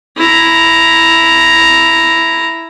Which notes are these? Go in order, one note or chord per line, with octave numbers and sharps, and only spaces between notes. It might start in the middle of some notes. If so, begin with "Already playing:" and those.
E4 A#5